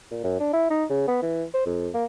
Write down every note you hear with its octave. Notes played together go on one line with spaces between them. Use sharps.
A#2
F#2
D4
E4
D#4
C#3
B3
E3
C5
F2
A#3